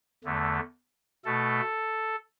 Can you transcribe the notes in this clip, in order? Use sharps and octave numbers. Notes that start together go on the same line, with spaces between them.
E2 D3 A3
B2 A3 A4